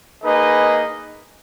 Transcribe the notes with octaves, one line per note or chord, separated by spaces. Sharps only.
A#3 D#4 G#4 B4 D#5